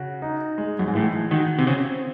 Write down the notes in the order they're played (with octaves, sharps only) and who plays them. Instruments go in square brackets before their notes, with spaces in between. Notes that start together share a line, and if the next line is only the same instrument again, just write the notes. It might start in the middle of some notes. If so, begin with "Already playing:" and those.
Already playing: [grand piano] C#3 F#4
D#4
G#3
[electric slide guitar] F#2
G#2
[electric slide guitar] A2 [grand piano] E3
[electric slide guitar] D#3 [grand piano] F#4
[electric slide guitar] C3
[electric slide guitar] C#3 [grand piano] C4